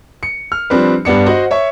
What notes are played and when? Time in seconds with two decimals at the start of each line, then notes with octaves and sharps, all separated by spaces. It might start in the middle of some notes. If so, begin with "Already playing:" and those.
0.23 C#7
0.52 F6
0.70 F3 G3 C4 D4 B4
1.05 G2 G3 B3 D4 C#7
1.26 F#4 C5 D#5 F#5
1.51 C#5 E5 C#6